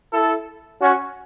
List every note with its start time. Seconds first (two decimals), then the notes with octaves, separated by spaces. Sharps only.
0.13 E4 A4
0.82 C#4 F#4